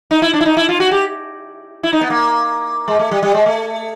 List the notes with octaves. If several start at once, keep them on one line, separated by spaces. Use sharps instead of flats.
D#4
E4
D4
E4
D#4
E4
F4
F#4
G4
E4
D#4
B3
A#3
G#3
A3
G3
G3
G#3
A3